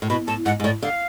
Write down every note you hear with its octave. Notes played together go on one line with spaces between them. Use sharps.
A2
B2 B5
A2 A5
G#2 F#5
G#2
A2 D5
D3 F5